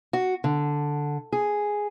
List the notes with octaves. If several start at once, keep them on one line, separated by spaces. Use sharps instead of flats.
F#4
D3
G#4